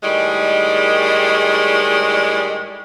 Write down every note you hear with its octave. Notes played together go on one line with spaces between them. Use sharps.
A2 D#3 G3 G#3